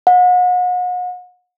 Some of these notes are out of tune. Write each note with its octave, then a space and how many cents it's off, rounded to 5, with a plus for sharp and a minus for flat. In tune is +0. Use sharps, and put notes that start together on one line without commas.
F#5 -40